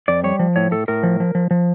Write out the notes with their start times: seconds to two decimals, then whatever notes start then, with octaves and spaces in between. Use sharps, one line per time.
0.08 F2 D5
0.24 G3 C#5
0.39 F3
0.56 A2 C#5
0.71 A2 A4
0.88 A2 A#4
1.03 F3
1.20 F3
1.35 F3
1.51 F3